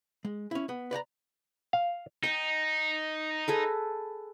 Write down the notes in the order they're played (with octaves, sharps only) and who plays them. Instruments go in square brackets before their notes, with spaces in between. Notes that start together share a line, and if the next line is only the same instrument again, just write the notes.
[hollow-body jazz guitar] G#3
C#4 E4
B3
B4 D5 F#5 A#5
[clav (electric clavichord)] F5
[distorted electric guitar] D#4 [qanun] D#5 G5
[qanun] G#4 A4 B4